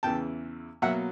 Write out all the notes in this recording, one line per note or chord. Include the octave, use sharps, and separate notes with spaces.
E2 C#3 E3 G5 A5
B2 F#3 A#3 E5 F#5